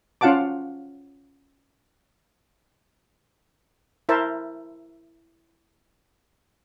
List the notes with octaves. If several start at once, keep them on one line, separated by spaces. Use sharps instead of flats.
C#4 F4 F5 F#5 A5 D6
E4 A#4 C5 E5 A5